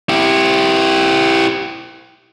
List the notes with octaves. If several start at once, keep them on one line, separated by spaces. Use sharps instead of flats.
E4 G4